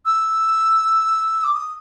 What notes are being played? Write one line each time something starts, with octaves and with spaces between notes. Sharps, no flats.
E6
D6
D#6